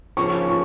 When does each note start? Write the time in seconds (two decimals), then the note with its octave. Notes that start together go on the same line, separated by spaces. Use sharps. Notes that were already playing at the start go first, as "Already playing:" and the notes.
0.17 C#3 F3 A#3 C#6
0.49 C#6